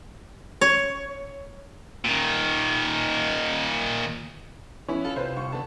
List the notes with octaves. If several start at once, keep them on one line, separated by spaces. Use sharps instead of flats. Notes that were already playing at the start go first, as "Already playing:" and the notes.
C#5
A#2 D#3
F3 B3 C#4 E4
F4 A4 F5
C3 B4 C5
G1 C#6
D3 B3 A5